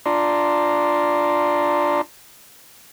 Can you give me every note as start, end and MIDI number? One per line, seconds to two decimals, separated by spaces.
0.06 2.01 62
0.06 2.01 65
0.06 2.01 74
0.06 2.01 81
0.06 2.01 82
0.06 2.01 84